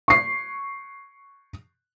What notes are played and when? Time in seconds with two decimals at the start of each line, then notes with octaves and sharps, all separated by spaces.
0.08 C#6 C7